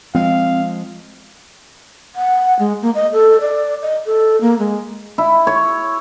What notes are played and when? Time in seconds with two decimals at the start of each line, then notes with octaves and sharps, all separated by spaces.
0.15 F3 G#3 C4 F5
2.15 F#5
2.59 G#3
2.82 A#3
2.95 D#5
3.13 A4
3.41 D5
3.82 D#5
4.06 A4
4.41 A#3
4.59 G#3
5.18 E4
5.47 C#5